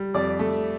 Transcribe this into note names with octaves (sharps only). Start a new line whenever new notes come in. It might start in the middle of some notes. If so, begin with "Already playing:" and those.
Already playing: G3
F2 D5 D6
A3